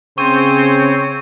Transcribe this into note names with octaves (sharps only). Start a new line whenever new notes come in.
C#3 C4 C5 C#5 C#6 D#7